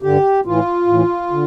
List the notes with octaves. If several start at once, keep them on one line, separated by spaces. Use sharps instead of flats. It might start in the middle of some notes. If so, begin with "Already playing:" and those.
G2 D3 G4
A2 E3 F4
A2 E3
D3